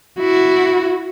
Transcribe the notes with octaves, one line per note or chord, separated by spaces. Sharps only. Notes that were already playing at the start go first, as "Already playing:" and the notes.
E4 F#4